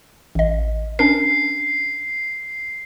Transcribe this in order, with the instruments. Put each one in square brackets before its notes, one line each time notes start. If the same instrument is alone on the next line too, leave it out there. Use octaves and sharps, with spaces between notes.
[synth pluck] A1 D#5
[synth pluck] C#4 D4 A#4 [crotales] C7